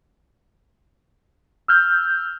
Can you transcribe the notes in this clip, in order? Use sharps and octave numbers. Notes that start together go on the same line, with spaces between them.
E6 F6 G6